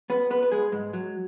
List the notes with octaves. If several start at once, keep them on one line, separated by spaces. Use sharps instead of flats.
B3 B4
B3 B4
B4
G#3 G#4
G#2 G#3
F#3